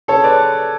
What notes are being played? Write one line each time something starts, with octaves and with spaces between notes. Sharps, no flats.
C#3 A4 C#5
B4 D5